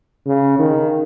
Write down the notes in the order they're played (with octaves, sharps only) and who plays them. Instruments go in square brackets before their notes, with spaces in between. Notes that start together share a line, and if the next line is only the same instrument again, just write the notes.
[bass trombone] C#3
D#3